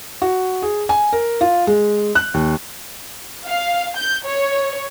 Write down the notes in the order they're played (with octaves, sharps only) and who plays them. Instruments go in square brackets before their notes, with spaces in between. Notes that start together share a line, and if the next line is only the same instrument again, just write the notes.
[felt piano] F#4
G#4
G#5
A#4
F4
G#3
F#6
D#2
[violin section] F5
G6
C#5